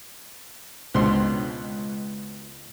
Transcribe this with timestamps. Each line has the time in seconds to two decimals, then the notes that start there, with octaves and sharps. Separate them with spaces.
0.94 C#2 B2 D4 C5 C6